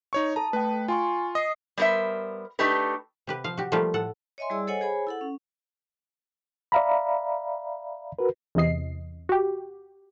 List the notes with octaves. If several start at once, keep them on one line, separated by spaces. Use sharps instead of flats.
D#4 C#5 C#6
A4 A5 A#5
A3 B4 G5
F4 G#5 C6 C#6
D#5 D#6 C7
G3 B3 A#4 C5 E5
A3 D4 D#4 G4 B4
C3 G4 B4
F3 F5
F#4 G4
F3 G3 A3 A#3 F4 G4
A2 A4 F#5
C#5 D#5 E5 G#5 C6
G3 E4 G#4 D5 E6
A4 C5 C#5 D#5 F#5 G#5
G#4 C5 C#5 G#5 B5
E4 A4 F#5
C#4
D5 E5 F5 A#5 B5
F#4 A#4 B4
E2 C3 E3 D#5 C7
F#4 G4